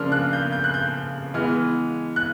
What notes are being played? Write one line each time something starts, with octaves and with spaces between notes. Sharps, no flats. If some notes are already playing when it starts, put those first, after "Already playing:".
Already playing: C#3 F3 A#3 D4 C6 F6
F#6
G6
G6
F#6
G6
E3 G#3 B3 F6
F#6